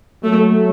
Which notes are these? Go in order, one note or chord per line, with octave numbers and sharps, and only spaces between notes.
F#3 A3